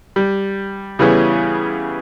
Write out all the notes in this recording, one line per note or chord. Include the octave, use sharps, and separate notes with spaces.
G3
C#3 E3 G3 B3 C#4 G#4